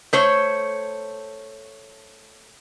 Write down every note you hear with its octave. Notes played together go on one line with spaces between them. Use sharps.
A3 C5 C#5